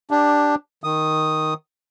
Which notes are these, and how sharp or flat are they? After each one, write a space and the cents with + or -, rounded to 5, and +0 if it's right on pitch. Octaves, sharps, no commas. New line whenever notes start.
D4 +0 G4 +10
D#3 +0 D#6 +0